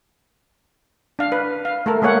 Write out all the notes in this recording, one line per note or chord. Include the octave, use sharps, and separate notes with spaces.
D4 F5
B4
F5
A3 A4 A#4
G#3 A#3 G#4 C#5 F#5